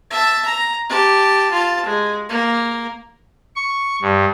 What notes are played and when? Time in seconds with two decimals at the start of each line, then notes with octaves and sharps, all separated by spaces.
0.10 E5 A5
0.46 A#5
0.89 G4 A5
1.51 F4 A5
1.85 G#3
2.29 A#3
3.56 C#6
4.02 G2